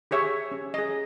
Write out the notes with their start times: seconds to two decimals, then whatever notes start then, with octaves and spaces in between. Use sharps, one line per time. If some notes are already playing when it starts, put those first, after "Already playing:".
0.11 G4 G#4 C#5 E5
0.52 C#4
0.74 G#4 D#5